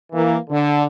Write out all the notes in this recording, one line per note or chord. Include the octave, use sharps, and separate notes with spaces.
E3 A#3
D3